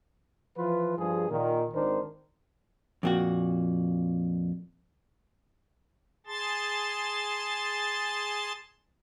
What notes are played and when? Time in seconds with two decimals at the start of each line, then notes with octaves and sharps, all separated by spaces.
0.57 E3 F3 F4 B4
0.97 G2 F3 G#4
1.29 A#2 D#3
1.73 G#1 D#3 D4 A#4 C5
3.03 F2 A#2 F#4
6.26 G#4 A5 C6 A6